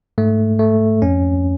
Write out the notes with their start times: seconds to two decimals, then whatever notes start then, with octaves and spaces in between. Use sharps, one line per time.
0.18 G#2 A3
0.59 A3
1.02 F2 C#4